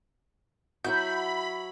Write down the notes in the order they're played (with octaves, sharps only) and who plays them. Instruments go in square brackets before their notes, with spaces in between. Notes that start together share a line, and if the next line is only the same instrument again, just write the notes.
[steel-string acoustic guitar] F#3 E4 F#4 [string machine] B5 [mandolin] G6